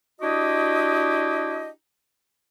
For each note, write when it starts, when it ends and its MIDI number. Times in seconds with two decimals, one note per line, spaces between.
0.21 1.69 62
0.21 1.69 64
0.21 1.69 66
0.21 1.69 67
0.21 1.69 75